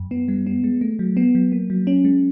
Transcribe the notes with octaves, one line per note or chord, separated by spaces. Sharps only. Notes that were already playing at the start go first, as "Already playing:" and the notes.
Already playing: F#2
B3
G3
B3
G#3
A3
F#3
B3
F#3
A#3
F#3
C#4
G#3